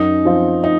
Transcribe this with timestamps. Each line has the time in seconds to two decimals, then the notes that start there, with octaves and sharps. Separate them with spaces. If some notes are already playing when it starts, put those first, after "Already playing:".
Already playing: F#2 D#4
0.25 F3 C4 F4
0.64 D#4